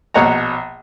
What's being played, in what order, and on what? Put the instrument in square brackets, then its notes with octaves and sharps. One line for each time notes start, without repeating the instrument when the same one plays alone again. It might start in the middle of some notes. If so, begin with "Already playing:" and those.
[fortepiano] A#1 B2 C#5 F#5 A#5